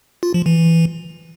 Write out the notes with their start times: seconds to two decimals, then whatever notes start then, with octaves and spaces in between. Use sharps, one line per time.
0.23 F4
0.34 F3
0.46 E3